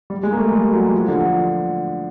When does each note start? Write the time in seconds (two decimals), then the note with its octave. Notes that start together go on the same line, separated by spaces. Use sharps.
0.10 G3
0.23 G#3
0.33 A#3
0.38 A3
0.52 G3
0.73 F#3
0.94 F3
1.08 D3